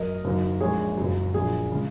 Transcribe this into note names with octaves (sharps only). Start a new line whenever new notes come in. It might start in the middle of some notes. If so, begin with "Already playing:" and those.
Already playing: F#2 F#3 A#4 D#5
F#1 F#2 D#3 F#3
A#1 A#2 G#3 G#4 C#5
F#1 F#2 F#3
A#1 A#2 F#3 G#4
C#3 G#3